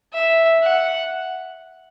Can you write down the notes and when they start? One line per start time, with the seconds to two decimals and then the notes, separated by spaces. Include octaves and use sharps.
0.13 E5
0.63 F#5